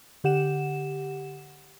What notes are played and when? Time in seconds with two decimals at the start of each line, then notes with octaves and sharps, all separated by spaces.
0.24 D3 G4 F#5 E7